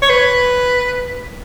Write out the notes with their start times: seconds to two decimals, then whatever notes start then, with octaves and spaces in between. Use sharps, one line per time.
0.02 C#5
0.10 B4